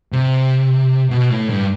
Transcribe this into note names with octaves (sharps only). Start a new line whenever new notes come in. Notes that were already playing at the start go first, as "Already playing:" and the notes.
C3
B2
A2
G2